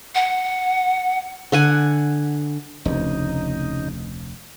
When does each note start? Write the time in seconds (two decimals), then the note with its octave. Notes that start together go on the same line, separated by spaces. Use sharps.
0.15 F#5
1.52 D3 F#5 G#5
2.85 F1 D2 C#3 D#4